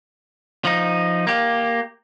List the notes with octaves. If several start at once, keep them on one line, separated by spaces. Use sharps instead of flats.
F3 D#4
A#3 G4